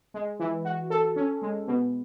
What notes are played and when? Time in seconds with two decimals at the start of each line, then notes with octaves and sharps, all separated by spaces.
0.14 G#3
0.39 E3
0.65 F#4
0.90 A4
1.16 C#4
1.42 G#3
1.67 B2